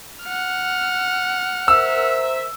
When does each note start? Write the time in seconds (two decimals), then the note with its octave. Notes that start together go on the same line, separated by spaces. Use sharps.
0.24 F#5 F6
1.68 A#4 C5 E5 E6